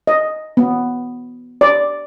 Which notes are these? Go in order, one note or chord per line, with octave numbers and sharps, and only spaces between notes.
D#5
B3
D5